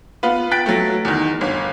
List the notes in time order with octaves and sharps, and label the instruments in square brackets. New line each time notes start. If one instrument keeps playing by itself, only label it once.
[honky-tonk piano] B3 F4 B4
G5 F#6 A6 B6 D7
F#3 A3
E2 D#3
G1